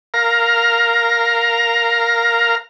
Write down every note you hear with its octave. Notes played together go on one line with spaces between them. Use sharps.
A#4 F5 A#5